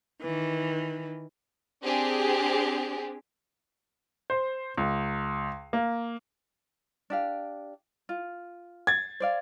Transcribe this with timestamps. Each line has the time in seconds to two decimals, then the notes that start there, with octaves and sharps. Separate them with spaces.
0.22 D#3 E3
1.83 C4 D4 G4 G#4
4.30 C5
4.77 C#2
5.73 A#3
7.10 D4 G4 F5
8.09 F4
8.87 G#6 A6
9.20 C5 D5 F5